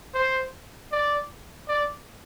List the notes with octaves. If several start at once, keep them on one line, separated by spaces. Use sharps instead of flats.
C5
D5
D5